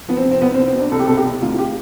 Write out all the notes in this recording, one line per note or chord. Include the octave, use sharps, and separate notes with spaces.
F3 B3
C4
C3
C4
C2 B3
C4
C2
C4
B2 D4
C2 A4
G4
B2 A4
G4
C2
D2 F4
F4
G4